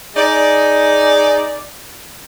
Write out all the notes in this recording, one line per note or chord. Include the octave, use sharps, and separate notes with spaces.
D#4 G#4 D5